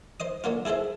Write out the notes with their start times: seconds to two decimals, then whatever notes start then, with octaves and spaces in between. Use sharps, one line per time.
0.20 C5 D#5 D#6
0.44 D3 F#3 A#3 F4
0.65 E4 G#4 A4 C5 E5